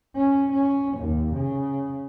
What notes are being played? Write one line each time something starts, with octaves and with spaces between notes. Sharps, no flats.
C#4
C#4
D#2
C#3